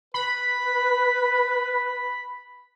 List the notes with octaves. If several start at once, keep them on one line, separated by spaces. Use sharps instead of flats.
B4 B5